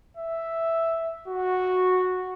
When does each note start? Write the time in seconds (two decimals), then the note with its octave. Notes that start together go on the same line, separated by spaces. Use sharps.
0.17 E5
1.28 F#4